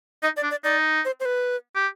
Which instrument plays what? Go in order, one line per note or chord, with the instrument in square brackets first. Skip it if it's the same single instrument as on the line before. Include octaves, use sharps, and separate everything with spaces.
[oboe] D#4 [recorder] D#5
[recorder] D5
[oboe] D4
[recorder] D5
[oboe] D#4 [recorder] D5
[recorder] C5
C5
B4
[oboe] G4